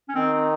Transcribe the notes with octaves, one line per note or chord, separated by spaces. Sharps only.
C#4
D#3 C4
C4